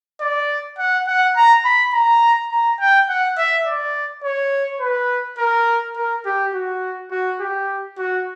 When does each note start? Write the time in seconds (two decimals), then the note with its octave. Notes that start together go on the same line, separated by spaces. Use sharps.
0.21 D5
0.79 F#5
1.07 F#5
1.36 A#5
1.65 B5
1.93 A#5
2.51 A#5
2.80 G5
3.09 F#5
3.38 E5
3.66 D5
4.24 C#5
4.81 B4
5.38 A#4
5.96 A#4
6.26 G4
6.54 F#4
7.11 F#4
7.41 G4
7.98 F#4